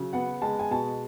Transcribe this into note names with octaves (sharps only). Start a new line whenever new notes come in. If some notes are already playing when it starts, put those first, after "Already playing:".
Already playing: C#3 F#3
B3 F#5
G#3 A5
G#5
B2 A5